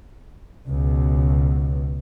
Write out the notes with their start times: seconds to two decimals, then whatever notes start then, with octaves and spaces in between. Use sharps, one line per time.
0.68 C#2 B2